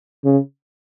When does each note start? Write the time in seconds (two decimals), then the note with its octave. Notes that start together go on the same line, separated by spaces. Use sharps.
0.25 C#3